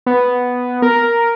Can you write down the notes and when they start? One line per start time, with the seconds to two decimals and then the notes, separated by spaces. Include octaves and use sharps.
0.06 B3
0.82 A#4